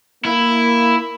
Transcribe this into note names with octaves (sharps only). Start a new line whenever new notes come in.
A#3 E4